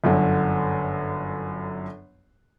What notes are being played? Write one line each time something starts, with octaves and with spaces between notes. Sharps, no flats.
G1 F#2 D3